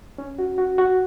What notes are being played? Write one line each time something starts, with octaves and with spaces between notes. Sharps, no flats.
C#4
F#4
F#4
F#4